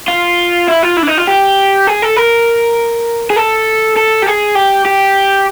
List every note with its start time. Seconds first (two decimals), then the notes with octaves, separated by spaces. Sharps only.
0.08 F4
0.68 E4
0.83 F4
0.97 E4
1.03 D4
1.08 D#4
1.18 F4
1.28 G4
1.87 G#4
2.02 A4
2.17 A#4
3.30 G#4
3.36 A4
3.96 A4
4.22 G4
4.26 G#4
4.55 G4
4.86 G4